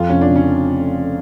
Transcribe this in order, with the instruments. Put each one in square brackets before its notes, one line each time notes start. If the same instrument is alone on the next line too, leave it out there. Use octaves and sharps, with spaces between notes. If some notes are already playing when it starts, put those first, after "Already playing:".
Already playing: [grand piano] F2 [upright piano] F4
[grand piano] F1 [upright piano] C#4
[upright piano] D4
[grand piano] C#3
[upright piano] C#4